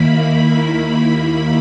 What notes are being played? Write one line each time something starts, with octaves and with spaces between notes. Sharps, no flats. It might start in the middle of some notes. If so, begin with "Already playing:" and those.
Already playing: D#2 D#3 A#3 E4 B5